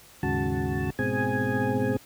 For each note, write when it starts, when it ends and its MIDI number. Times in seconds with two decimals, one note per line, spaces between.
0.23 0.90 39
0.23 0.90 44
0.23 0.90 49
0.23 0.90 66
0.23 0.90 81
0.99 1.97 44
0.99 1.97 47
0.99 1.97 60
0.99 1.97 68
0.99 1.97 80